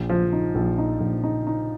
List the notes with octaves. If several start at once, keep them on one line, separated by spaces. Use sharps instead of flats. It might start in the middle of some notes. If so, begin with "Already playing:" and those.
Already playing: A#1
F3
D#4
A#1
D#4
A#1
D#4
D#4